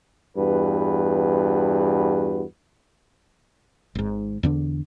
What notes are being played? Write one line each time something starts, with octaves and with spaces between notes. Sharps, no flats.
E2 G2 F#4 B4
G#1 G#2
E2 D3 D4